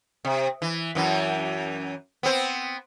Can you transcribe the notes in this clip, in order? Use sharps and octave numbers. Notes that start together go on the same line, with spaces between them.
C3
E3
F#2 E3
B3 C4